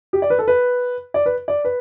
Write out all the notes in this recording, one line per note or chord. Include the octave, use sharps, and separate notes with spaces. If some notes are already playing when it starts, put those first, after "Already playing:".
G4
D5
B4
A4
B4
D5
B4
D5
B4